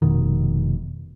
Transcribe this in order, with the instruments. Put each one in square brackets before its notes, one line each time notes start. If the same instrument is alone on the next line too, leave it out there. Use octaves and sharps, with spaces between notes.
[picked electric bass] F1 B2 D#3